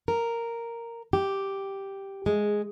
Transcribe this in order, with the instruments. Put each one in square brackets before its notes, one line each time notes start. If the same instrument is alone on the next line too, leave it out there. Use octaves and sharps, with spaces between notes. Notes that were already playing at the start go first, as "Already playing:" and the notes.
[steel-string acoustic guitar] A#4
G4
G#3